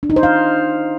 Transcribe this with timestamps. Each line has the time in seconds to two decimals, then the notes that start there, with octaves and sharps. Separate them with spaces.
0.03 D4
0.10 D#4
0.16 C5
0.23 F5